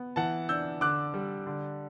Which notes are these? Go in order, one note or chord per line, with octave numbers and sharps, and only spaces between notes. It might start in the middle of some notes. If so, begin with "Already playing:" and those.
Already playing: B3
E3 F#5 A5
D4 E6 G6
D3 D6 F#6
G3
D3